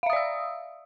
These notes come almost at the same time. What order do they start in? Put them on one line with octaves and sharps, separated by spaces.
F5 E5 D#6 D5 E6